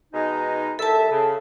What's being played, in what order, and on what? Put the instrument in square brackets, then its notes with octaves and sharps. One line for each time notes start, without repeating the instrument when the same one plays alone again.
[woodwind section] B2 G#3 D#4
[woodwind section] C2 E5 [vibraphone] A4 A5
[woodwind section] C#3